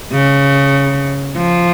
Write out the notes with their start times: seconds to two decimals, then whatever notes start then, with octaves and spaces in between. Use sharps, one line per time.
0.12 C#3
1.37 F3